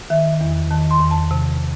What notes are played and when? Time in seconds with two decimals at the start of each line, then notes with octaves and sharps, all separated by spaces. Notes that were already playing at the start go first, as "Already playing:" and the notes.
0.10 D#3 E5
0.41 E2
0.71 D#3 A5
0.91 C6
1.00 E2
1.11 A5
1.31 C3